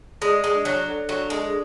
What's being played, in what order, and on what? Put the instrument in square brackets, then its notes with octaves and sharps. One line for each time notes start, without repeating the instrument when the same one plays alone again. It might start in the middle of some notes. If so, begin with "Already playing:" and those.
[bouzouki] G#3 [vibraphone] D5
[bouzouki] G#3
[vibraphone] D4
[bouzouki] F#3
[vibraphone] A4
[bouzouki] F#3
[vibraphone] D4
[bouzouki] G#3